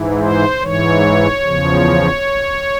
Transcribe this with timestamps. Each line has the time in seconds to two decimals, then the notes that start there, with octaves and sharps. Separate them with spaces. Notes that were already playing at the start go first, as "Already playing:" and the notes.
Already playing: G#2 E3
0.20 C5
0.61 G#2 E3 C#5
1.43 E2 C#3 F3